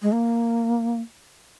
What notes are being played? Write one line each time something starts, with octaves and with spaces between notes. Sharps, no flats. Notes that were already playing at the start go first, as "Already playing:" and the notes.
G#3
A#3